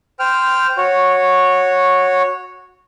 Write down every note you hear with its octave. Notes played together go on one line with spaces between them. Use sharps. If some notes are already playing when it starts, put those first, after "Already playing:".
C5 G5 F6
F#4 C#5